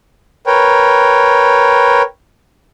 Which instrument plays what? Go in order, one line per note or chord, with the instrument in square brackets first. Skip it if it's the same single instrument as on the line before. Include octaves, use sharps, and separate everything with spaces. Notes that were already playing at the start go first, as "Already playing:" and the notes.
[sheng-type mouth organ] A#4 B4 C#5 G5